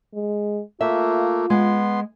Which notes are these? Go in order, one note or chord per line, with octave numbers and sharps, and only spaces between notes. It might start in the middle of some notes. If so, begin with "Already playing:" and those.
G#3
A3 A#3 F4 E5
G#3 B3 C6